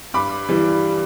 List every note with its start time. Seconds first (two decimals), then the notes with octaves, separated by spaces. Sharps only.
0.14 G2 B5 D6
0.49 E3 G3